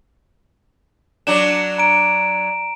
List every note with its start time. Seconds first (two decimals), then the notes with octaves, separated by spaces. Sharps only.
1.27 F#3 D4 E7
1.78 A#5 D7